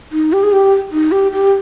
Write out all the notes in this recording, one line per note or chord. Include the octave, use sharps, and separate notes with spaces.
D#4
G4
G#4
G4
D#4
G4
G4